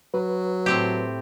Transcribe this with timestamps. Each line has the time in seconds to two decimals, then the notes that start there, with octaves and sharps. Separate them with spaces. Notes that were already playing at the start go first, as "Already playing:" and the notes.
0.14 F#3 B4
0.66 A2 C4 G4